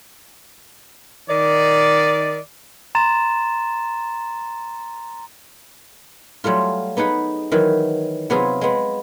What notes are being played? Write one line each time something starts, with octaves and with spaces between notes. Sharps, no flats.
D#3 D5
A#5 C6 A6 E7
F#3 G3 A3 F4
B3 D#4 G#4 F#5 B5
D#3 E3 F#3
C3 F#3 B3 F4 G#4
G#3 B3